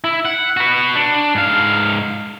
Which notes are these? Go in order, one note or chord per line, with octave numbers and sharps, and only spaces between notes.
E4
F#5
F#4 B4
D4
G#2 F5